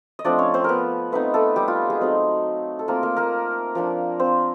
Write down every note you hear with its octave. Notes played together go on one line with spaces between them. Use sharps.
D#5
F3 A3 C4 D4 D5
C#4 C#5
C4 C5
B3 A#4 B4
A3 B3 C4 D#4 B4
A3 A4
G3 G4
F4
G#3 G#4
F#3 A3 C4 D#4
A4
A3 A#3 C4 F4 A#4
A#3 A#4
A#3 A#4
F3 A#3 D4
C4 C5